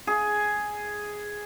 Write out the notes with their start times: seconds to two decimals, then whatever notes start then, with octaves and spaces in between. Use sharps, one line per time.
0.07 G#4